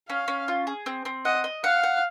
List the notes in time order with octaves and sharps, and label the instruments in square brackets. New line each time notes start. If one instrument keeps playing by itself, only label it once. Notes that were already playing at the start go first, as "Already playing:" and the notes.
[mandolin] C#4 [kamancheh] F5
[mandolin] C#4
F4
G#4
C4
C4
[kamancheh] D#5 [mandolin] F#5
[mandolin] D#5
[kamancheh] F5 [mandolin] F#5
[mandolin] F#5